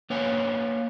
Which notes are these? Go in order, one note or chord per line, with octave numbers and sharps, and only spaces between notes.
A#3 B4 C#5 F5 F#5 G#5